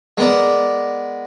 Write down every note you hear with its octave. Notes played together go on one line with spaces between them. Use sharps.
G#3 B3 A#4 D5